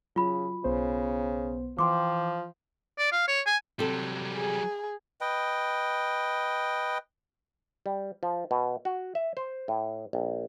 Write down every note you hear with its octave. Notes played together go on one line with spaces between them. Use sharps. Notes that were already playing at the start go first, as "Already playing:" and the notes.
C#3 F#3 F4 B5
B1 C#3 B3 C5
E3 F3 G5 C6 D6
D5
F5
C#5
G#5
C3 F#3 G3 A4
G#4
B4 D#5 G5
G3
F3
B2
F#4
E5
C5
A2
A#1